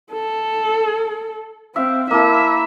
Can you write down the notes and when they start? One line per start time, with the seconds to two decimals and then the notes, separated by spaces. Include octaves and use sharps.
0.12 A4
1.76 C4 E5 F5
2.11 A#3 E4 E5 A5